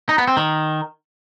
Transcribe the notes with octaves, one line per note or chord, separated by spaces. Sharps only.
D#4
B3
C4
D#3